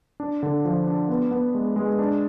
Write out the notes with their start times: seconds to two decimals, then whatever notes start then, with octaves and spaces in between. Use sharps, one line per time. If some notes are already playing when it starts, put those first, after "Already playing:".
0.20 D4
0.43 D3
0.65 F3
0.87 D4
1.09 B3
1.31 B3
1.55 G#3
1.76 G#3
1.99 D4